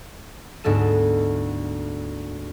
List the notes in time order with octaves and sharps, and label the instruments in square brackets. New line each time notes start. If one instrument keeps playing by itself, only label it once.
[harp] D2 G#2 B3 A4 E7